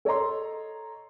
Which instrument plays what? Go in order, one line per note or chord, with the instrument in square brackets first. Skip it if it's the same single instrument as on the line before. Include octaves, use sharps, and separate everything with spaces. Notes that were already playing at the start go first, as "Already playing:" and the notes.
[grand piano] A4 C#5 D#5 A#5 C6